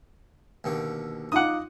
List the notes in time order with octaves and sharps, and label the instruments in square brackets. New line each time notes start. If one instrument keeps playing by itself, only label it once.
[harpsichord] D#2 B2 D3
[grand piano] D#4 F4 D6 [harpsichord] D#5 [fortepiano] F#5 D#6